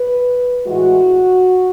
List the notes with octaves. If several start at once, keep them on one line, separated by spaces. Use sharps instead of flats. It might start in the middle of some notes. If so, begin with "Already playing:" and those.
Already playing: B4
A2 E3 G#3 F#4